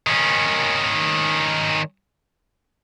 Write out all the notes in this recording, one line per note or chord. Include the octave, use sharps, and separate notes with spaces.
D#3 C#4